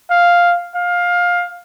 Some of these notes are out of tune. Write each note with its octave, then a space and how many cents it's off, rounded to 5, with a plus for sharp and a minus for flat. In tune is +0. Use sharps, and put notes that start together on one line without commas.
F5 +0
F5 +20